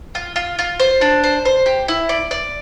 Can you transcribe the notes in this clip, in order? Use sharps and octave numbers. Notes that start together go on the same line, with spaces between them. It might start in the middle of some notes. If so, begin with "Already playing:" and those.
F4
F4
F4
C5
D4
C5
C5
G4
E4
D5
D5